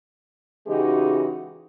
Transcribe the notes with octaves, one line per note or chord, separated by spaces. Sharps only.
C#3 E3 G#3 D#4 F#4 G4